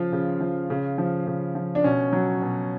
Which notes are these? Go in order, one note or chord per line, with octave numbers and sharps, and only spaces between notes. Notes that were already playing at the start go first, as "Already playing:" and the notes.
Already playing: C#3 F3 F4
C#3
F3
C#3
F3
C#3
F3
D4
B2 C#4
F#3
B2